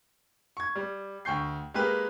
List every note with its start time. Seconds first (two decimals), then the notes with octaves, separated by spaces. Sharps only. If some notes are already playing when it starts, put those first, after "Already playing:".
0.57 C#6 G#6
0.75 G3
1.25 D2 G5 C#6 G6 C7
1.74 G#3 A#3 G4 A#4 B4